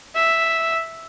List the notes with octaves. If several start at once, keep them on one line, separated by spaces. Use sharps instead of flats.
E5